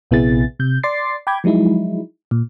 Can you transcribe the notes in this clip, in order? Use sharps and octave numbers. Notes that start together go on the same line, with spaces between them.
A#1 C3 B3 E4 G#4 A6
C3 G6
D5 C6 D6 A6 C7
G5 B5 D6 G6 G#6
F3 F#3 G#3 D#4 E4
A#2